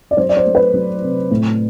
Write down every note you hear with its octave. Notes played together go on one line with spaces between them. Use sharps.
D5
F#3 C5
D5
C5
A3
B4
F#3
C3
A2